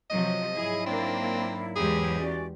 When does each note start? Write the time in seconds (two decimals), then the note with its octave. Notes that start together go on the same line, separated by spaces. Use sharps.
0.10 C3 F3 F#3 D#5
0.54 G#2 F#3 E4 G#4
0.87 A#3 C4 D4
1.76 E2 G#3 G4 G#4
2.20 C#4 F#4 D5